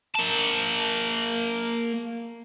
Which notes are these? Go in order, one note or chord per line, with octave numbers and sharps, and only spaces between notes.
A#3 A5